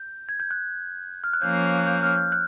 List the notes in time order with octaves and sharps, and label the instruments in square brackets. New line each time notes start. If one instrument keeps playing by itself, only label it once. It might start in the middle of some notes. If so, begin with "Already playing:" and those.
Already playing: [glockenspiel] G6
G#6
G6
F#6
F6
F#6
[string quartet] F3 A#3 C#4 [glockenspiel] G6
[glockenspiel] F#6
G6
F6
G6
F#6